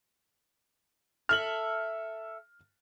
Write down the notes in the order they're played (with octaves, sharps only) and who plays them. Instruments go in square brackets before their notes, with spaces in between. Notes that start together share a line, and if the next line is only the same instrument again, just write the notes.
[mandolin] A4 E5 [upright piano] F6 F#7